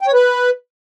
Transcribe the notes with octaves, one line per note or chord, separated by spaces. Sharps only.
G5
C#5
B4